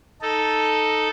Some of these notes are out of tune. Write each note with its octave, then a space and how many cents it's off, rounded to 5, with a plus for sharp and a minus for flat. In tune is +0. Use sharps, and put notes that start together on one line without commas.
D#4 +0 A4 +0